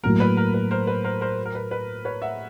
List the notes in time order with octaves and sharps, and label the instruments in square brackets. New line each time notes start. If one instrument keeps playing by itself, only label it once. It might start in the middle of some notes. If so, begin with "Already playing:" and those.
[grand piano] A2 F#3 A#3 [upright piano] A#4
[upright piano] B4
A#4
B4
A#4 C5
B4
A#4 C5
A#4 C5
A#4
B4
B4
B4 C#5
E5 F#5